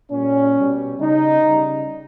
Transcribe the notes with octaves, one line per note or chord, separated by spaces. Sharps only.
A#2 G3 C#4
B2 G3
C#3 G3 D#4
C#3 G3